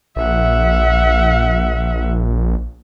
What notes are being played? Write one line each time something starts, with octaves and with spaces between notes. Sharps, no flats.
A#1 E5 F#5